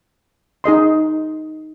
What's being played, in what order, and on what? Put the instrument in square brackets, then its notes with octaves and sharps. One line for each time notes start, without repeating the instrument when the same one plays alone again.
[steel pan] D#4 G#4 D#5 C6